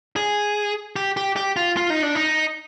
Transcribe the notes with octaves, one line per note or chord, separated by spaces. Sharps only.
G#4
G4
G4
G4
F4
F4
D#4
D4
D#4